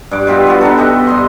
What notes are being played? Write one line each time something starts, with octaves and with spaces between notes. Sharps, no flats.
G2 D6
B2 F4 G4 E5
B3 F#4
B3 D4 D#4 A4
G4 D#5 E5
G2 D#5 C6